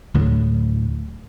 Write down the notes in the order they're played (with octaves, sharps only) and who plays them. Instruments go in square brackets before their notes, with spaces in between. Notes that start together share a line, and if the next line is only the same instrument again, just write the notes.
[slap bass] D2 A2 D3 F#3